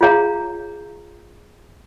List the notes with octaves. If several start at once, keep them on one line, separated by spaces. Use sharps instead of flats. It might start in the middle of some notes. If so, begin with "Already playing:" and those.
F4 G#4 C#5 F5 A#5